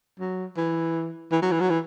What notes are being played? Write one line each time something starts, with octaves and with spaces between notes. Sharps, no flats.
F#3
E3
E3
F#3
E3
F#3
E3